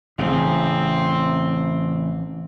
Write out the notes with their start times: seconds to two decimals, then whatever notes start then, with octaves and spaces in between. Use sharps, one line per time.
0.18 A1 C#3 C4